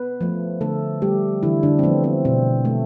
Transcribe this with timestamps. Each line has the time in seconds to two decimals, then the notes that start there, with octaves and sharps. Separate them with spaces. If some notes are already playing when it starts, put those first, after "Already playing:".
Already playing: B3 B4
0.21 F3 A3
0.61 D3 A3 A4
1.02 G3 A3 G4
1.43 D3 E3 E4
1.63 D3 D4
1.79 C4
1.83 F3 A3 B3
2.04 C4
2.25 B2 C4
2.65 A3